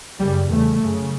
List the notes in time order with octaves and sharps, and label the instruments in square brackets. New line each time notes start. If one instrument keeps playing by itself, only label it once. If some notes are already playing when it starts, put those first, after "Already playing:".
[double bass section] F#2 C#3 G3
E2 C#3 A3
F#2 C#3